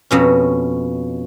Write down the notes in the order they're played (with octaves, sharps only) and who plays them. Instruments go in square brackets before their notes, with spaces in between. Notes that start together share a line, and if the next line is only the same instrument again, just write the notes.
[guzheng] F2 B2 C#4